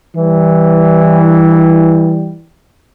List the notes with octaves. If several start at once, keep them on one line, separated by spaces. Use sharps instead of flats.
E3 G3